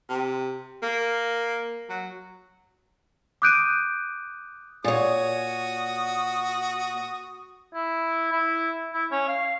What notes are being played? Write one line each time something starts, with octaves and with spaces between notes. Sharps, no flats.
C3
A#3
F#3
D6 D#6 F#6 G6 D7 D#7
A#2 F#4 C#5 D#6
E4
E4
E4
C#4
F5